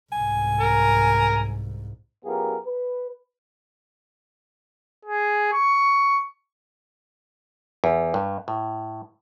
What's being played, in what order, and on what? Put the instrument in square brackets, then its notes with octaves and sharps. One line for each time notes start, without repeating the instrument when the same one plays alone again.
[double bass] C2 G#2 [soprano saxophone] G#5
[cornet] A#4
[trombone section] F#2 B3 F4 G4 G#4 A#4
B4
[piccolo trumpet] G#4
C#6
[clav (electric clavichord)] E2
G2
A2